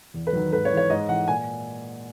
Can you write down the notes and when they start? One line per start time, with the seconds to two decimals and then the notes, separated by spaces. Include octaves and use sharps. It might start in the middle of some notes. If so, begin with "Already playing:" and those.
0.14 E2
0.27 B4
0.33 D#3 F#3
0.53 G#2 B4
0.65 C#5
0.72 E3
0.77 C#5
0.90 G#2 D#5
1.09 E3 F#5
1.28 A#2 G#5